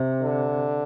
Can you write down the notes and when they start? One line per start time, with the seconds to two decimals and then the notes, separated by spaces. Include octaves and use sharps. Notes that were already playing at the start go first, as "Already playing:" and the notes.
Already playing: C3
0.22 D3